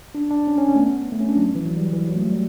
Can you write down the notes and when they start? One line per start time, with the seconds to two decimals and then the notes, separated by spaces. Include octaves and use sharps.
0.15 D4
0.31 D4
0.47 C#4
0.58 C#4
0.69 C#4
0.75 A3
0.79 B3
1.12 A3
1.21 C#4
1.28 D4
1.36 F#3
1.55 E3
1.66 F#3
1.77 G3
1.93 E3
2.09 F#3
2.15 A3
2.20 G3
2.31 G3